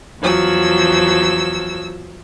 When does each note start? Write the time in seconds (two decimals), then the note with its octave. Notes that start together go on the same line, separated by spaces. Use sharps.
0.20 E2 F3 F#3 E6